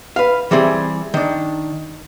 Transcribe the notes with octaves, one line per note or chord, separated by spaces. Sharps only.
B4 F5
E3 G3 C4 G#4
D#3 D4